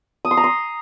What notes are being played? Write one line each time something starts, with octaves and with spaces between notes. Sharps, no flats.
D#6
C6
A#5
C6